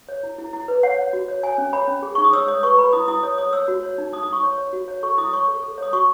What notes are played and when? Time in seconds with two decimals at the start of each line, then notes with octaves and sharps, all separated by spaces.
0.09 C#5
0.23 E4
0.38 E4
0.53 E4
0.68 B4
0.83 C#5 F#5
0.98 C#5
1.13 F#4
1.28 C#5
1.43 C#5 G#5
1.58 C#4
1.73 C#5 B5
1.88 C#4
2.03 G#4
2.15 D#4 C#6
2.24 D#6
2.33 C#5 E6
2.48 C#5 D#6
2.63 B4 C#6
2.78 B4 B5
2.93 E4 D#6
3.08 E4 D#6
3.23 C#5 D#6
3.38 C#5 D#6
3.53 C#5 E6
3.68 F#4
3.83 C#5
3.98 D#4
4.13 D#4 D#6
4.23 D#6
4.28 D#4 C#6
4.43 C#5
4.58 C#5
4.73 F#4
4.88 C#5
5.03 A4 C#6
5.18 E4 D#6
5.33 C#5 C#6
5.48 A4
5.63 A4
5.78 C#5 D#6
5.93 F#4 C#6